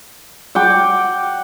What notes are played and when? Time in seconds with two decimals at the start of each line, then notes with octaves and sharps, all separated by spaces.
0.55 F#5 G5 D6